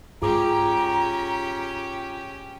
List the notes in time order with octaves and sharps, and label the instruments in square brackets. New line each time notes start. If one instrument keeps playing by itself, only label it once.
[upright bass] G#2 [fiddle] C#4 G4 [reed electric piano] F4 G#4 D6 [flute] A#5